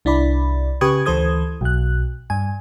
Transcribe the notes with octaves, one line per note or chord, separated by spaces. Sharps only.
C2 D4 E4 D5 B5
C#3 G4 B4 C#6 D#6 G#6
D2 E3 A4 C5 D#6 G#6
B1 F#6
G2 G#5